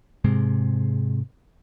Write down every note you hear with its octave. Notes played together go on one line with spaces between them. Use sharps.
G#2 C3 G#3 C4